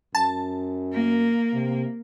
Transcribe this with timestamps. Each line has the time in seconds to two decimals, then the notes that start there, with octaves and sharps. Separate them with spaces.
0.15 F#2 A5
0.93 A#3
1.53 C3